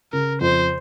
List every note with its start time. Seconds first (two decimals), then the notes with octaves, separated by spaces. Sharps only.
0.13 C#3 A#4
0.41 F2 C5